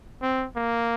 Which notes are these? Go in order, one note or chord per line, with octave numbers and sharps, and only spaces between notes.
C4
A#3